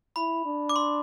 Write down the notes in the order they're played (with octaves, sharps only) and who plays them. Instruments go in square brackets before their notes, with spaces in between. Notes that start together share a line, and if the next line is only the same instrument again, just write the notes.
[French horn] E4 [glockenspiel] B5
[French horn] D4
[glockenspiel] D6
C6